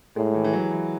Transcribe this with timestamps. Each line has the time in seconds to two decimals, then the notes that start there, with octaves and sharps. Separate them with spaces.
0.16 A2 G#3
0.34 E3
0.44 E3
0.53 F#3
0.71 E3